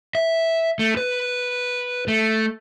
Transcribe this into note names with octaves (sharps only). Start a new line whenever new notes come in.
E5
A3
B4
A3